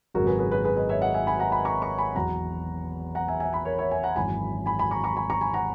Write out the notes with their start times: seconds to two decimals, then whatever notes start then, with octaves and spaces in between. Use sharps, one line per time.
0.14 G#1 F#2 C#3 F#3 F#4 A#4
0.27 G#4 B4
0.39 G#4 B4
0.51 G#4 B4
0.65 G#4 B4
0.77 B4 D#5
0.89 C#5 E5
1.02 D#5 F#5
1.14 E5 G#5
1.27 G#5 B5
1.39 F#5 A#5
1.52 G#5 B5
1.65 A#5 C#6
1.82 A#5 C#6
1.98 G#5 B5
2.15 E2 B2 F#3 F#5 A#5
3.15 F#5 A#5
3.28 E5 G#5
3.40 E5 G#5
3.53 G#5 B5
3.65 A#4 C#5
3.78 C#5 E5
3.91 E5 G#5
4.04 F#5 A#5
4.16 G#1 F#2 E3 G#5 B5
4.66 G#5 B5
4.79 G#5 B5
4.91 A#5 C#6
5.04 A#5 C#6
5.16 G#5 B5
5.30 A#5 C#6
5.41 G#5 B5
5.54 F#5 A#5